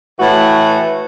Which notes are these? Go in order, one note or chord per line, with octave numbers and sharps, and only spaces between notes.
A2 E3 F#4